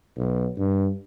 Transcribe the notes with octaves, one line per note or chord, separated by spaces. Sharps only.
B1
G2